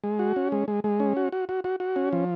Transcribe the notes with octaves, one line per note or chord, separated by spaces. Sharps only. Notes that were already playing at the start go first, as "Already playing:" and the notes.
G#3
F#4
C#4
G#3
G#3
G#3
C#4
F#4
F#4
F#4
F#4
F#4
C#4
F3